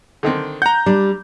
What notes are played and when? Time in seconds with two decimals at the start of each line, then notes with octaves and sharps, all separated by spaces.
0.23 D3 D#3 C4
0.62 F#5 A#5 G6
0.86 G3 D4